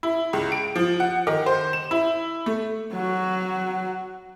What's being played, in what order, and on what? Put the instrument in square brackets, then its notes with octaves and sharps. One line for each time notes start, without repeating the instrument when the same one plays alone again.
[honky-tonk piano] E4
C#2
D7
F3
F#5
D#3
C5
E7
E4
A3
[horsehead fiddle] F#3 F#4